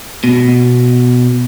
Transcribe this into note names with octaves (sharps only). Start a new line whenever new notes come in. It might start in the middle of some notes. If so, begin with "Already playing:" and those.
B2